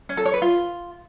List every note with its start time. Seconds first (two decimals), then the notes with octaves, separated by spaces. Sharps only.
0.09 C#4
0.17 A4
0.25 C#5
0.34 B4
0.42 F4